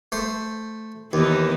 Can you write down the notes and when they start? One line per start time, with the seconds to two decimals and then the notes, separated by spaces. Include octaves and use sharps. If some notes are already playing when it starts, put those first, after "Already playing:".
0.12 A3 C5
1.13 D#2 E3 B3 D#4